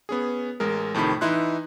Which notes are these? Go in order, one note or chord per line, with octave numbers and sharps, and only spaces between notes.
B3 C#4 G#4
A1 G#3 A#4
F2 A2 C3 D#3 B5
E3 D#4 E4 C6 F#6